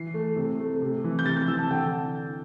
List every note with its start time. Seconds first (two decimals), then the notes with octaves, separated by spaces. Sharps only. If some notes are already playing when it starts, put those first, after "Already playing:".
Already playing: E3 C7
0.14 A3
0.36 C3
0.59 A3
0.82 C3
1.04 E3
1.19 G6
1.26 C3 A6
1.37 G6
1.48 E3 E6
1.59 A5
1.71 D3 G5